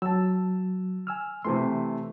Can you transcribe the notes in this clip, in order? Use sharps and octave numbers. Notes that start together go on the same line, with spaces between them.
F#3 A5 E6
G#5 E6 F6
C3 E3 A3 C6